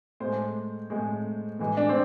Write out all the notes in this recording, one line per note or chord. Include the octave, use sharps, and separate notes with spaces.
A2 G#3 C5
A2 G#3
A2 E3 G#3
D4
C4